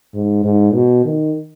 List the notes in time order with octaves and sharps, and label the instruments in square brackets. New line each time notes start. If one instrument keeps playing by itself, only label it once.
[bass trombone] G#2
G#2
B2
D#3